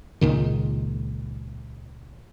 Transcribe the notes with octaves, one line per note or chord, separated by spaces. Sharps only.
C#2 A#2 D#3